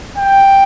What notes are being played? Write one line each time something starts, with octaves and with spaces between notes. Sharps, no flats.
G5